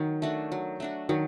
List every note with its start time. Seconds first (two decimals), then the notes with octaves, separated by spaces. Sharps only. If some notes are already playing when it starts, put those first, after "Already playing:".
Already playing: D#3 F#3
0.22 A3 D4 F#4
0.52 F#3
0.80 A3 D4 F#4
1.09 D#3 F#3